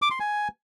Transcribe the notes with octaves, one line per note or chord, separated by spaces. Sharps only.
D6
C6
G#5